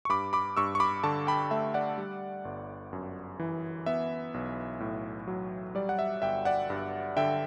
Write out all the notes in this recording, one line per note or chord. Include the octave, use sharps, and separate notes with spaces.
C#6
G2 B5 D6
B5 D6
G2 C#6 E6
C#6
B5 D6
D3 A5 C#6
G5 B5
A3 E5
D5 F#5
G3
G1
F#2
E3
B3 E5
B1
A2
F#3
G3 D5
F#5
E5
G1 E5 G5
D5 F#5
G2
D3 E5 G5